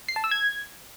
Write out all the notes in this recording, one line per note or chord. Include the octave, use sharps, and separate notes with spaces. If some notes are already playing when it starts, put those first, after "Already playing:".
C7
A5
E6
G#6